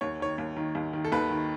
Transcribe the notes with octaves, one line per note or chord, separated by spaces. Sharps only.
D#2 C#5
D#3 C#5
D#2
D#3
D#2
D#3
A4
D#2 B4
D#3